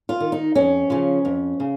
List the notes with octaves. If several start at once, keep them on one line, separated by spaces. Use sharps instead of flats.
F4
D#3
D#4
F2 C#4
C#3 F3
F2
C#3